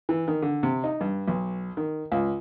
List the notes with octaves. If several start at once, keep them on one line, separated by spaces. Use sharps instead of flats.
E3
D#3
D3
C3
D#4
G2
B1
D#3
C#2